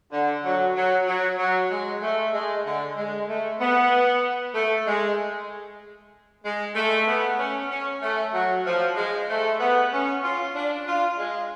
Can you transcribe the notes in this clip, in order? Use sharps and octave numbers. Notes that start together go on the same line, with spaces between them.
D3
F#3
F#3
F#3
F#3
G#3
A3
G#3
D3
G#3
A3
B3
A3
G#3
G#3
A3
B3
C#4
C#4
A3
F#3
F3
G#3
A3
B3
C#4
F4
D4
F4
G#3